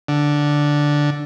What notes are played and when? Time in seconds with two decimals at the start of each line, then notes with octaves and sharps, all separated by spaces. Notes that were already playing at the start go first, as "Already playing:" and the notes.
0.08 D3